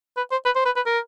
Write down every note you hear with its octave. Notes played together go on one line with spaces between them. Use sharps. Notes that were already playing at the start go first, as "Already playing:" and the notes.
B4
C5
B4
C5
B4
B4
A#4